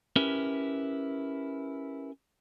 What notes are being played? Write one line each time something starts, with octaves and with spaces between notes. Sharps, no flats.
C#4 E4 G4 A#4 B4